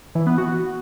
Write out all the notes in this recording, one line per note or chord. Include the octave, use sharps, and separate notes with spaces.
E3
B3
F#4